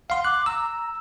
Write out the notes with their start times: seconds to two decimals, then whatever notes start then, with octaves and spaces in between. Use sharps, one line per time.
0.10 F5 F#5 C6
0.25 D6 F#6
0.46 A#5 E6